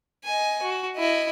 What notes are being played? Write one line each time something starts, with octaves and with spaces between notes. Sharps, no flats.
D#5 G#5
F#4
E4 D#5